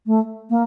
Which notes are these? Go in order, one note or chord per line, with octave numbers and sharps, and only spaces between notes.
A3
A#3